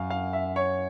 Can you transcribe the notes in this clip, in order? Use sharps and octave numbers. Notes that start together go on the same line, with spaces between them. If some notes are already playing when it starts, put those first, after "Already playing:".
Already playing: F#2 F5
F5
E5
C#5